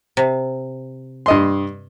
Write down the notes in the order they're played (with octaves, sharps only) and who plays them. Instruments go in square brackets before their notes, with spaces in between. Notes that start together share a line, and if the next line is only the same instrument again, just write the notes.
[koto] C3
[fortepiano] G2 D#5 C6